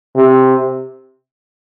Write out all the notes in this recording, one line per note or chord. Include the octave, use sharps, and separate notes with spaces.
C3